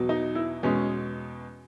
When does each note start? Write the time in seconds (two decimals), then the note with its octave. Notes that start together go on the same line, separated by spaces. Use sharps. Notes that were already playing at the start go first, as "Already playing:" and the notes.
Already playing: E2 B2 F#3
0.09 D#4
0.35 E4
0.63 E2 B2 G#3 C#4